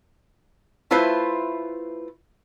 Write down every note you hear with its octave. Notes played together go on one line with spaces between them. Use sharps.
A3 E4 F4 B4 C5